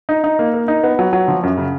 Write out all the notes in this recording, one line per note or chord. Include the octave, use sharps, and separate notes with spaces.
D#4
D#4
A#3
A#4
D#4
B3
F#3
F#3
F3
F#2
C#3